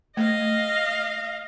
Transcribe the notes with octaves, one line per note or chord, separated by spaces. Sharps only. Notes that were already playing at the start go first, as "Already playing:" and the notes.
A3 D#5 F5